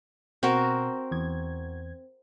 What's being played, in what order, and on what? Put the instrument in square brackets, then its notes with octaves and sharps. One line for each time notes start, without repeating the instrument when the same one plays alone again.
[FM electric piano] B2 [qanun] C4 F#4 A#4
[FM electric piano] E2 G#6